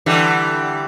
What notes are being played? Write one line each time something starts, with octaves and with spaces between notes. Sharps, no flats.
D3 E3 G3